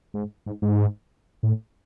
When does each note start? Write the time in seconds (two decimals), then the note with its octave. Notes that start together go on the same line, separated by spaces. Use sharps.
0.14 G#2
0.46 G#2
0.62 G#2
1.43 A2